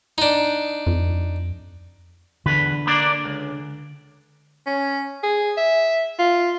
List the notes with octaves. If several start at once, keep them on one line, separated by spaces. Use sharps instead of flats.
D4 D#4
F2
E2 D3 B4
A#3 D4 D5
C#2
C#4
G#4
E5
F4